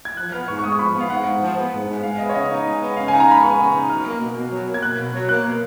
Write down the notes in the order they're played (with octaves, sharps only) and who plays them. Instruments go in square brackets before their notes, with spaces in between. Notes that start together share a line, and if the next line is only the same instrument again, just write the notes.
[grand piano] G#6
[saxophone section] F3 [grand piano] F#6
[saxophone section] B3 [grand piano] F6
[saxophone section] G#2 [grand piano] C#6
[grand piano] C#6
[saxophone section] G#2 [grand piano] D#6
[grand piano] C#6
[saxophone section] F3 [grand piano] B5
[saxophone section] B3
[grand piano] F5
[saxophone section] G#2 [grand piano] F#5
[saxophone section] G#2
F3
B3
G#2
G#2
[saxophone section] G#3 [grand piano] F5
[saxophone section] B3 [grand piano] D#5
[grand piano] C#5
[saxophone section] C#3 [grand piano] D#5
[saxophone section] D#4
G#3
B3
[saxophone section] C#3 [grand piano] F5
[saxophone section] D#4 [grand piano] G#5
[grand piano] A#5
[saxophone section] G#3 [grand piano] B5
[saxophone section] B3 [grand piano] C#6
[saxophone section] C#3
D#4
[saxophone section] F#3 [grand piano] F6
[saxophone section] A#3
B2
B2
F#3
A#3
[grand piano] G#6
[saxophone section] B2 [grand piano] F#6
[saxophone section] B2
F#3
[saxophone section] A#3 [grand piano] F#6
[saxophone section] B2